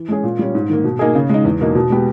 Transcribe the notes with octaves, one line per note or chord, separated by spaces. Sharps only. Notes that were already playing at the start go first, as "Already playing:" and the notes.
Already playing: E3
G#3 C#4 G#4
A#2
G3 C#4
G#2
D#3 A#3
B2
A#3 D#4 G#4
C#3
G#3 D#4
E2
B2 A#3 D#4
B2
G#3 B3 G4